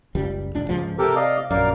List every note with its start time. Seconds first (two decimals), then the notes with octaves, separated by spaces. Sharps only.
0.15 F#1 C#2 G3
0.55 D#1 D4
0.69 C#2 G#2 F3
0.99 C3 G4 A4 A#4
1.16 D5 D#5 F5
1.51 A#1 F#2 A#4 D5 F5